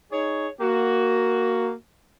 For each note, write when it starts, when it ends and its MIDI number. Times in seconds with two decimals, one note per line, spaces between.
0.12 0.49 63
0.12 0.49 68
0.12 0.49 73
0.61 1.72 58
0.61 1.72 66